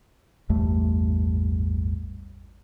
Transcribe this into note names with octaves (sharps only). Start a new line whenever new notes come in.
A1 E2 G2 A3